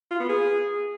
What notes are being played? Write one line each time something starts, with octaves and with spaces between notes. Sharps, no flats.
F4
B3
G#4